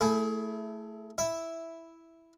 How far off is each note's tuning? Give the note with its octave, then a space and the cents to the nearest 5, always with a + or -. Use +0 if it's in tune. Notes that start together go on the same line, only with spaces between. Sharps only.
A3 +5 E4 +0 G#4 +30
E4 +0 E5 +0